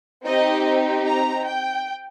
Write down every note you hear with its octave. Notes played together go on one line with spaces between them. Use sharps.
C4 D#4 G4 D#5
A#5
G5